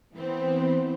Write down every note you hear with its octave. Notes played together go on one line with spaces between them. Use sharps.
E3 B3 C4